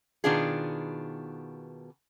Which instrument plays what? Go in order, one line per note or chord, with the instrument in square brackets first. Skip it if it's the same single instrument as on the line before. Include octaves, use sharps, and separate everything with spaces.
[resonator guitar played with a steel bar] B2 D#3 B3 D4 F4 G#4